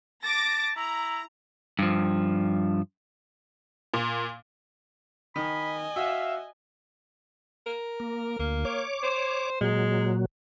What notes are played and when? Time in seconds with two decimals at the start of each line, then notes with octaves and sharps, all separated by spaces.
0.24 A5 D6 A#6
0.76 E4 A#5
1.79 G2 F3
3.94 A#2
5.36 D#3 D#5 G#5 B5
5.96 F#4 E5 F5
7.66 A#4
8.00 A#3
8.39 D2 A#3
8.65 C#5 D6
9.03 C5
9.61 A#2 F#3 G#3